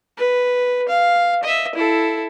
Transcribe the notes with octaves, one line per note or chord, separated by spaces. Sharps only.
B4
F5
D#5 E5
E4 A4